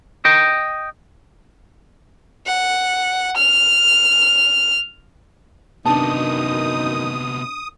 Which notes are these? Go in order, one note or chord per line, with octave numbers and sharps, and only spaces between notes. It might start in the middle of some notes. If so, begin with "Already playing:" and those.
D#5 G5
F#5
F6
F#2 C3 D#3 B3 D4 D#4 A5 D#6